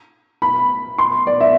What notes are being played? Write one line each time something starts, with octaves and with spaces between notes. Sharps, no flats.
B5
C6
D5
E5